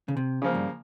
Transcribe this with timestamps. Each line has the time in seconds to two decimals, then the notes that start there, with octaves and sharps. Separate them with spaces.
0.08 C#3
0.17 C3
0.42 C#3 F3 A#3
0.55 G2